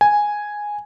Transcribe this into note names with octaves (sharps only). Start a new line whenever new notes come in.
G#5